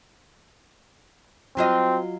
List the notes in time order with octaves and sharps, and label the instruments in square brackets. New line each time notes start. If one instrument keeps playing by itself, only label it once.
[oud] F#3 F4 D#5 [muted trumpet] C4